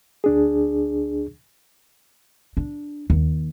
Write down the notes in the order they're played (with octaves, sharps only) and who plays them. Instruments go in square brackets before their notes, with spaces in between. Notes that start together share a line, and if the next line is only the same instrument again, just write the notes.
[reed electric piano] D2 D4 G#4
[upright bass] D4
D#2